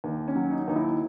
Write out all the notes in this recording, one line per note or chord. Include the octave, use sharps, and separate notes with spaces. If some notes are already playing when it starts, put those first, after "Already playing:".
D#2
C#4
F#3
D#4
D#2 D#4
E4